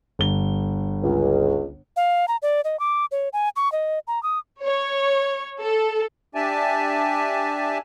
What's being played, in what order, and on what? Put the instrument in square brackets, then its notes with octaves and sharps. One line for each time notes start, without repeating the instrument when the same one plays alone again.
[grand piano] G1 G7
[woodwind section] C#2
[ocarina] F5
A#5
D5
D#5
D6
C#5
G#5
C#6
D#5
A#5
D#6
[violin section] C#5
A4
[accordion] D4 G4 D5 E5 G#5 A5